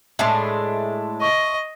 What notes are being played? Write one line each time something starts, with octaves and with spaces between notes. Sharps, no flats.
A2 G#3 D4 E5 A5 C6
D#5 C#6